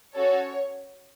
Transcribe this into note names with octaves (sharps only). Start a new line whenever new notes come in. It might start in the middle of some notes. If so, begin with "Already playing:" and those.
C#4 F#4 A4 C#5